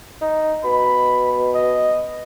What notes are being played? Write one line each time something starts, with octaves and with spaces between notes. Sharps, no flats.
D#4
B2 B5
D#5